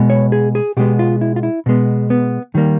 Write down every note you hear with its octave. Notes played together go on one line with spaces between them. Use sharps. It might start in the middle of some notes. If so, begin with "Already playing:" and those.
Already playing: B2 G#3 B3
C#5
G#4
G#4
B2 G#3 B3 G4
F4
E4
F4
E4
B2 G#3 B3
B3
D#3 G3 A#3